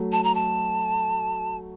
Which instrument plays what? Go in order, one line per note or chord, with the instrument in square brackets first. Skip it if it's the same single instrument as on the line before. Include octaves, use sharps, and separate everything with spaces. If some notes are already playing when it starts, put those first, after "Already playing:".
Already playing: [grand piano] F#3 A3
[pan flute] A5
A#5
A5